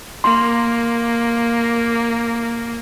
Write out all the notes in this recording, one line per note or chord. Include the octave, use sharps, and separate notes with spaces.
A#3 C6